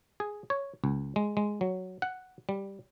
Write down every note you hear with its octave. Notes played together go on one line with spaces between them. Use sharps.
G#4
C#5
C#2
G#3
G#3
F#3
F#5
G3